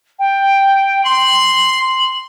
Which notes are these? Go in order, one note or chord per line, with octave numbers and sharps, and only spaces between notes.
G5
C6 F#7